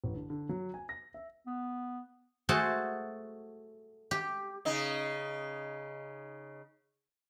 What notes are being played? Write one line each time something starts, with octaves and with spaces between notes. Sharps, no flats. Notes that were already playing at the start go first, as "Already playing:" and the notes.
A1
D3
D3
F#3
G#5
A#6
E5
B3
A3 F#4 G#4 C5 A5
G4
C#3 D#4